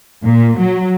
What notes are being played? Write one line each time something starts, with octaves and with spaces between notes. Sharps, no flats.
A#2
F#3